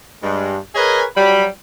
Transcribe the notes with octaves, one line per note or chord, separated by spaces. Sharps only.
G2 G#3
G#4 A#4 B4 C#5 D#5 G#5
F#3 G3 B5